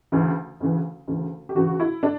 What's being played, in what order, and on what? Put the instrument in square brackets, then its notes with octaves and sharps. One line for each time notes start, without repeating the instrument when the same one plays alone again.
[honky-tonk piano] D2 C#3 E3
D2 C#3 E3
D2 C#3 E3
G4
D2 C#3 E3 F#4
E4
D4